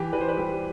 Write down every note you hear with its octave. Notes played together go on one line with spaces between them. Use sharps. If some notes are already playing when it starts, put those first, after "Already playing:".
Already playing: E3 G4
E3 B4
C5
B4
G3 G4